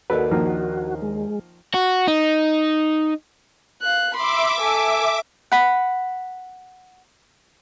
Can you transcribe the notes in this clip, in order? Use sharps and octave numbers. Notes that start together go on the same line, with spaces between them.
D#2 D4 F#4 A4 B4 D5
D#3 F3 A#3
G#3
F#4
D#4
F5 F#6
E5 B5 C6 D6
A4 G#5
F#5 B5